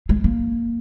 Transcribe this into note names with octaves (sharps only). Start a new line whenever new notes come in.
G#3
A#3